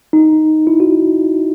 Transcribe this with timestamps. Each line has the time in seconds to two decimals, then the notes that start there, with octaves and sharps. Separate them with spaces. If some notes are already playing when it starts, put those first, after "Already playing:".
0.13 D#4
0.67 E4
0.80 F#4